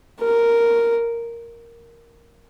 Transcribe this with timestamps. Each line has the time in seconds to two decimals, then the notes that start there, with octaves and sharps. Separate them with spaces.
0.21 A#4